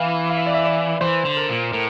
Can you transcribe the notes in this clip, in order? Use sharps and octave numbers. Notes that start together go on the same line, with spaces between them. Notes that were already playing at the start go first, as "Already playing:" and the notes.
Already playing: E3 E5 F5
F5
E5
D5
E5
D5
E3 C5
D3
A#4
A#2
A2 A#4